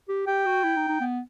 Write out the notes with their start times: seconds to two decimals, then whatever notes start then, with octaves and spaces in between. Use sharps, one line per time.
0.09 G4
0.27 G4 G5
0.46 F#4
0.64 E4
0.76 D#4
0.88 D#4
1.01 B3